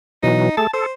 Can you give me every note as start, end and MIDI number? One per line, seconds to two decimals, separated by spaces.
0.23 0.49 47
0.23 0.49 52
0.23 0.49 54
0.23 0.54 63
0.57 0.67 57
0.57 0.67 68
0.57 0.67 69
0.57 0.69 81
0.73 0.86 69
0.73 0.93 72